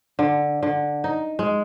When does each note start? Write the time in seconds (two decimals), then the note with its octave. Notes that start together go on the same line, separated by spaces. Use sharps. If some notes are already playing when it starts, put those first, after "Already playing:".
0.19 D3
0.63 D3
1.04 D#4
1.39 G#3